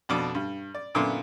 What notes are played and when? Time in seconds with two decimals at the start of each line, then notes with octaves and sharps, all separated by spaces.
0.09 F2 B2 D4 D6
0.35 G2
0.75 D5
0.95 F#2 A#2 D3 B3 E4 C6